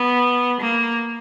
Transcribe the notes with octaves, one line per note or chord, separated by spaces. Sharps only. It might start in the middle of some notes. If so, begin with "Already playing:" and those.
Already playing: B3
A#3